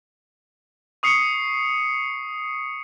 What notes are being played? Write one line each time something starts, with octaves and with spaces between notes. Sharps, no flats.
C#6 D#6 C7 C#7